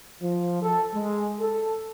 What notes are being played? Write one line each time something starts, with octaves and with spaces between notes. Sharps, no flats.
F3
A4
G#3
A4